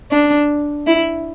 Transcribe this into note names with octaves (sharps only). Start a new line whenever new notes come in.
D4
E4